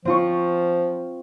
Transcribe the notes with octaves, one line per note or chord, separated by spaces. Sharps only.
F3 C4 F4 C#6